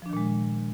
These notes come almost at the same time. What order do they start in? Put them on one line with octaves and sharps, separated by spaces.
F3 D4 D#3 A#2 G#3